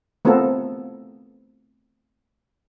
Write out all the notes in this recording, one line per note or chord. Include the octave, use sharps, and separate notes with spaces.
A3 B3 C4 F4 A4 A#4